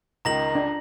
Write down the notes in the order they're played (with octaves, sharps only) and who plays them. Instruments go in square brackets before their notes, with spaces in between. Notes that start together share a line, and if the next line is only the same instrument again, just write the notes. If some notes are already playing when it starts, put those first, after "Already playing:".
[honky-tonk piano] C#2 [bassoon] D#3 [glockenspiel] A#5 A#6 F#7
[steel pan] D4